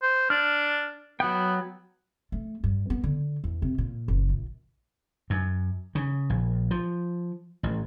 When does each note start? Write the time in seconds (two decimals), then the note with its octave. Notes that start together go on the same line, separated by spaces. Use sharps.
0.03 C5
0.30 D4 F6
1.20 F#3 B3 G5
2.32 A3
2.64 G2
2.90 B3
3.04 D3
3.44 E2
3.62 C3
3.78 A#2
4.08 F#1
4.30 A#1
5.30 F#2
5.95 C#3
6.30 A#1
6.71 F3
7.63 A1